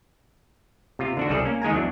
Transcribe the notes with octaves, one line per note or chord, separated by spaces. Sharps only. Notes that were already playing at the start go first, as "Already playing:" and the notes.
C3 F4
D3 D4 F#4
C2 G3 G#4 A4 D5
A#3 C#4
D#3 G#3 G#5 A#5
E2 F#3 D4